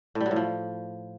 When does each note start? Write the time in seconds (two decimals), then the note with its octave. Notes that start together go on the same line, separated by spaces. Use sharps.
0.15 A2
0.21 G3
0.26 F#3
0.31 A2
0.36 F3